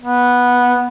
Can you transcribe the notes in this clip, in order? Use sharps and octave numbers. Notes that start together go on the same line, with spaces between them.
B3